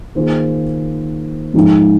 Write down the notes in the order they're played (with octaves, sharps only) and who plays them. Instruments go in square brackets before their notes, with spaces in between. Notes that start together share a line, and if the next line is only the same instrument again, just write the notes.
[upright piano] D#3 A#3 F4 G#4 C5
G#2 F3 G#3 D#4